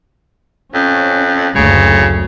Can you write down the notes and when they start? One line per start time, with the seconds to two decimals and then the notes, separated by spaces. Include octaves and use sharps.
0.74 F2 C#4
1.55 F#1 D2 C#3 A3